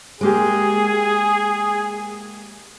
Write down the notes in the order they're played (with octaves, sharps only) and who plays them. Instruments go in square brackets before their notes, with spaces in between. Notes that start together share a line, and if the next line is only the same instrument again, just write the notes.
[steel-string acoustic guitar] G#3 A#3 G4 [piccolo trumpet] G#4